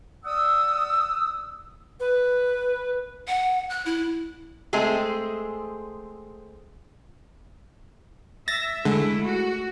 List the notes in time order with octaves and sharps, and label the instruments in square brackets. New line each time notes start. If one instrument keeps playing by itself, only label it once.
[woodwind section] D5 F#5 D#6 E6
[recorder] B4
[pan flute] F#5
F#6
E4
[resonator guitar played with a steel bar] G#3 A3 C4 G#4
[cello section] E5 [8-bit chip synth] A6 A#6
[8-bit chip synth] D3 [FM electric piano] G#3 [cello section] A3 E4
[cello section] F#4